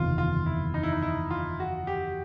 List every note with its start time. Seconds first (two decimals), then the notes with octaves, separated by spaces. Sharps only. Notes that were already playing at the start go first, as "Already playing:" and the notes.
Already playing: F#1 E2 C3 D#3 F4
0.18 F4
0.46 E4
0.74 D#4
0.83 E4
0.92 D#4
1.02 E4
1.30 F4
1.60 F#4
1.87 G4